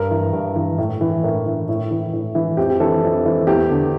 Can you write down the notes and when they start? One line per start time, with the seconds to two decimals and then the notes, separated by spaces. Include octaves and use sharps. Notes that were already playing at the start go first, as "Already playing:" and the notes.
Already playing: G2 A#4
0.11 E3
0.33 G2
0.56 E3
0.78 A2
1.01 E3
1.24 A2 A#4
1.46 E3
1.69 A2
1.91 E3
2.13 A2
2.35 E3
2.57 F2 G4
2.70 G4
2.80 E3 A4
3.03 F2
3.25 E3
3.47 E2 G4
3.70 D3